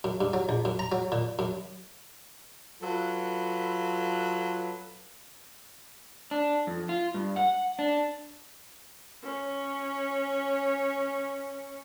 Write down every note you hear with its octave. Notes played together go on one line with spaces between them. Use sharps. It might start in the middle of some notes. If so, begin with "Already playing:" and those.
F#2
G2
F#3
A#1
F#2
A#5
F#3
A#2
F#2
F#3 F4 A4 B4
D4
F2
F4
G2
F#5
D4
C#4 C#5